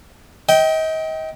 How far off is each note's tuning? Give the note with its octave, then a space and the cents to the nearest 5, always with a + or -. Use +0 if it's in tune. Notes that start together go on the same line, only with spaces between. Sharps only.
D#5 +35 G5 -10